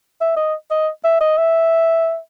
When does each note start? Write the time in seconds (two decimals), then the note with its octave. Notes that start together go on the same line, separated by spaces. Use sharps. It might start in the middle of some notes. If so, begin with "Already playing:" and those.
0.21 E5
0.37 D#5
0.71 D#5
1.04 E5
1.21 D#5
1.38 E5